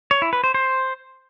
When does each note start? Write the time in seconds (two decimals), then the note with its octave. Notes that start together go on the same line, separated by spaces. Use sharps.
0.11 C#5
0.22 E4
0.33 B4
0.44 C5
0.54 C5